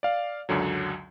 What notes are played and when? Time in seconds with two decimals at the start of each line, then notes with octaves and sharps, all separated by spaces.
0.03 D5 F5
0.49 C#2 F#2 D3 F#3